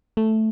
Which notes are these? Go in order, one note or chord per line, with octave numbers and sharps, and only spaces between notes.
A3